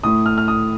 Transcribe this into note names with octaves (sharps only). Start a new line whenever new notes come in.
A2 A3 D#6
F6
F6
D#6